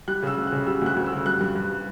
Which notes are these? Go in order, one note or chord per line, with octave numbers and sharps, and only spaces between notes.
G3 F#6
C#3 E6
D2
F#6
C#3
G3 E6
D2 F#6
D2
E6
C#3
G2 F#6
G2
G2